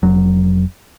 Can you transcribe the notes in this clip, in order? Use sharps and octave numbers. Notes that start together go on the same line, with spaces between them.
F1 F#3